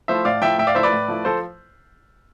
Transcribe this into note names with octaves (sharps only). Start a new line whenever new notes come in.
F3 A3 E4 C5 E5
A2 D5 F5
F3 A3 E4 E5 G5
A2 E5 G5
D5 F5
F3 A3 E4 C5 E5
B4 D5
A2
F3 A3 E4
F3 A4 C5